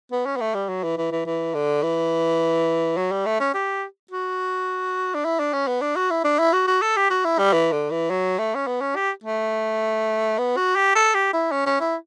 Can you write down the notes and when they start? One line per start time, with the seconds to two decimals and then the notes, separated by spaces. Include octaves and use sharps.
0.12 B3
0.26 C#4
0.36 B3
0.41 A3
0.54 G3
0.69 F#3
0.83 E3
0.97 E3
1.12 E3
1.26 E3
1.54 D3
1.83 E3
2.97 F#3
3.12 G3
3.26 A3
3.40 C#4
3.54 G4
4.11 F#4
5.15 D4
5.25 E4
5.40 D4
5.53 C#4
5.68 B3
5.81 D4
5.96 F#4
6.11 E4
6.24 D4
6.39 E4
6.53 F#4
6.67 F#4
6.82 A4
6.96 G4
7.10 F#4
7.25 E4
7.38 G3
7.53 E3
7.72 D3
7.91 E3
8.10 F#3
8.39 A3
8.55 C#4
8.67 B3
8.81 C#4
8.95 G4
9.24 A3
10.38 B3
10.56 F#4
10.76 G4
10.95 A4
11.14 G4
11.33 E4
11.51 C#4
11.66 C#4
11.81 E4